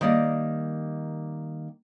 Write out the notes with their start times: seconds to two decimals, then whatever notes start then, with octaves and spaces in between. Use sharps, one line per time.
0.01 D#3 G3 A#3 D5 D#5